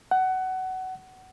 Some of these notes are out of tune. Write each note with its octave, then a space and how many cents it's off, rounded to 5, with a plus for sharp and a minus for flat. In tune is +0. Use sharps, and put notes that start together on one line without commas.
F#5 +20